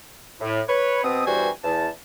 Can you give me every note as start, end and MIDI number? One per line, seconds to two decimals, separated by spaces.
0.40 0.61 45
0.68 1.00 71
0.68 1.00 73
1.04 1.22 47
1.04 1.22 60
1.04 1.22 87
1.26 1.49 40
1.26 1.49 43
1.26 1.49 55
1.26 1.49 66
1.26 1.49 72
1.26 1.49 80
1.64 1.87 40
1.64 1.87 81